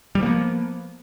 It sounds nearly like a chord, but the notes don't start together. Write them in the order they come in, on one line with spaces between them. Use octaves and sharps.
G3 F3 A#3 B3